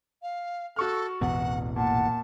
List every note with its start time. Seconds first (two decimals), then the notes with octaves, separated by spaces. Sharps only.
0.22 F5
0.76 F#4 A4 C#6 F6
1.21 A1 E2 B2 F#5
1.76 A#2 F#5 A5